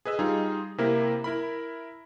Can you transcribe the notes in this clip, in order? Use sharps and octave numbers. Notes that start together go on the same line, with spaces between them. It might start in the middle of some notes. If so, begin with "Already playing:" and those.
G#4 B4 D#5 E6
G3 D#4 F4 G#4
C3 A#3 E4 A#4
E4 A#4 B5